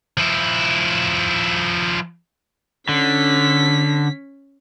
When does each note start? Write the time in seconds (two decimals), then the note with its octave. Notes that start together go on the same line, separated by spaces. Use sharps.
0.18 F3 E4
2.89 D3 C#4 B6